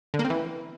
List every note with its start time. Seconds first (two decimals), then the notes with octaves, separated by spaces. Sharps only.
0.14 D3
0.19 A#3
0.25 C4
0.30 E3